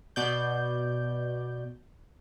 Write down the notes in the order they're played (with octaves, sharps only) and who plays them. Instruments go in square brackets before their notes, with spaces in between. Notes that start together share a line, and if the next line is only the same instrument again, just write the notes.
[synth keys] B2 D5 G6